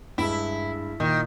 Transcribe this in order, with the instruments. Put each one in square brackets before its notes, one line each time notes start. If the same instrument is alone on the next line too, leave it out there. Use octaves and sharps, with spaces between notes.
[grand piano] G2 G#3 [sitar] E4
[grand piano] A#2 [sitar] D#3